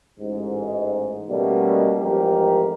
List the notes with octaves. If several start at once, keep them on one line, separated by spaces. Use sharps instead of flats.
A1 G#2
B2 G3 A3 A#3 C#4
A1 F2 G#2 G4 A#4